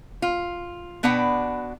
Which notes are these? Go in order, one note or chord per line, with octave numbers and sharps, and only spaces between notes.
F4
B2 B3 D4 B4 F#5 G5